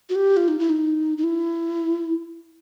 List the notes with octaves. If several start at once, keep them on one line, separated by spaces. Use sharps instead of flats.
F#4
G4
F4
D#4
E4
D#4
D#4
E4